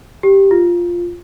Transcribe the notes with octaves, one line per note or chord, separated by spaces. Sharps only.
G4
F4